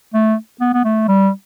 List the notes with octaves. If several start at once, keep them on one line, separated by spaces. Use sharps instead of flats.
A3
B3
B3
A3
G3